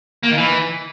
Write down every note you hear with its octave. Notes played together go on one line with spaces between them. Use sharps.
A#3
D#3
E3